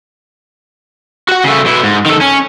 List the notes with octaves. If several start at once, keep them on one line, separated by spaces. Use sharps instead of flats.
F#4 F#5
C#3 A3
B2 E4
G#2
D#3 A4
C#4